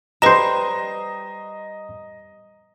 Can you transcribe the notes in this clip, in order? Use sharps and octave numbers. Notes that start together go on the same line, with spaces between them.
G3 B4 C5 D#5 A#5 A#6 E7